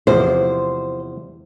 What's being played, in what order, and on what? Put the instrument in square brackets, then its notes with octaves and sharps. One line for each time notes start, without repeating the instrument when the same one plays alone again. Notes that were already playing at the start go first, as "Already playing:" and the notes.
[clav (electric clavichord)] E2 C3 F3 [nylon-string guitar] C5